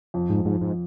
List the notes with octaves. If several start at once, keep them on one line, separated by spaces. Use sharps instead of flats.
F2
G#2
F2 G#2
G#2